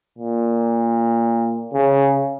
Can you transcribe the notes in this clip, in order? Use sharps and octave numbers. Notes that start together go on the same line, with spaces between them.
A#2
C#3